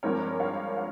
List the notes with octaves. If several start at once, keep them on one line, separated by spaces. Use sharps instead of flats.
G2 F3 G#3 C4 A#4 C#5
C#5 F5
C#5 F5